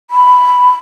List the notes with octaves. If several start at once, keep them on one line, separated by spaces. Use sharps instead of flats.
B5